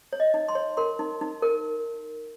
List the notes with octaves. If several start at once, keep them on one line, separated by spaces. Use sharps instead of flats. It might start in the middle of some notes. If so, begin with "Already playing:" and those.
C#5
D#5
D#4
C6
C#5
A#4 C6
D#4
D#4
A#4